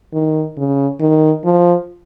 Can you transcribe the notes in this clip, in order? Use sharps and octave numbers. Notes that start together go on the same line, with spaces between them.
D#3
C#3
D#3
F3